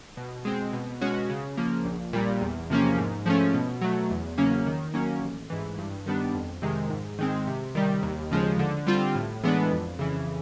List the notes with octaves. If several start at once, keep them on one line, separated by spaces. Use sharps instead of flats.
B2
G#3 C4
B2
G#3 C#4 F#4
C#3
F3 A#3
A#1
A#2 G3
E2
C3 F3 A#3 C#4
G#2
F3 A3 C#4
B2
F#3 A3
E2
C#3 F#3 A#3 C#4
D#3
F#3 A#3 C#4
A1
G#2 E3
G2
D#3 G3 B3 D4
F2
C3 D#3 G#3
G#2
D#3 G#3 C4
C3
D#3 G3
D#2
C#3 F3 G#3
D3
G3 C4 F4
A2
E3 G#3 B3 D4
F2
C#3 E3